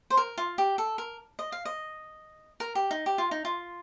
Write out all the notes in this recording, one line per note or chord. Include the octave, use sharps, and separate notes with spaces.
C5
A#4
F4
G4
A4
A#4
D#5
F5
D#5
A#4
G4
D#4
G4
F4
D#4
F4